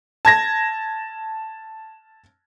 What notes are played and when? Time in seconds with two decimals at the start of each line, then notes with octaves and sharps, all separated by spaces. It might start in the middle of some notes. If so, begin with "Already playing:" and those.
0.25 A5 G#6 A#6